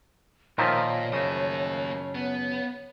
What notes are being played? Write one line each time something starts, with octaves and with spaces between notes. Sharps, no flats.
A#2 D#3 F3 F4 A#4 C#5 E5
F#2 C#3 A3 A#3 D#5
B3